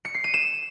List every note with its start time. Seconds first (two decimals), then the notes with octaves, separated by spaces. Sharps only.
0.05 C#7
0.14 C7
0.24 D#7
0.34 E7